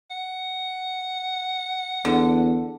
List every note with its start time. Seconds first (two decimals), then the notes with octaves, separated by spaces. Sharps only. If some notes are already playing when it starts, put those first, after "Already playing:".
0.11 F#5
2.05 E2 D3